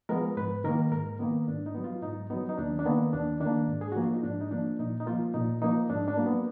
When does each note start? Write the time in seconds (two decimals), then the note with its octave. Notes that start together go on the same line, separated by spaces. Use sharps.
0.09 F3 G#3 B3 A#4
0.37 G#2 B4
0.64 D#3 A#3 A#4
0.92 G#2 A#4
1.19 D#3 A#3 B3
1.47 G#2 D4
1.66 D#4
1.75 F#3 B3
1.84 F4
2.02 G#2 D#4
2.30 F#3 B3 D#4
2.49 D#4
2.57 D#2 D4
2.79 D4
2.86 D#3 A#3 B3
3.13 D#2 D4
3.40 D#3 A#3 D4
3.68 G#2
3.81 G#4
3.92 F3 A#3 F#4
4.02 F4
4.14 D#4
4.23 G#2 D4
4.41 D#4
4.51 F3 A#3 D4
4.79 A#2 D#4
5.00 D#4
5.06 F3 A#3 F4
5.34 A#2 D#4
5.62 F3 A#3 D#4
5.90 G#2 D4
6.08 D4
6.17 F#3 A#3
6.26 B3